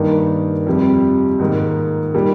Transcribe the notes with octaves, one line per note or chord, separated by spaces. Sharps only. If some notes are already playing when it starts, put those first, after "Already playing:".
Already playing: G2 D#3 A#3 D#4
F2 C3 G3
G#2 D#3 A#3 D#4
A#2 G3 A#3 D#4